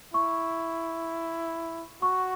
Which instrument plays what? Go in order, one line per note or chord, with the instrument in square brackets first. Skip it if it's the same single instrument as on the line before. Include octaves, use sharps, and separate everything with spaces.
[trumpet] E4 [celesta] C#6
[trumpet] F#4 [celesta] C#6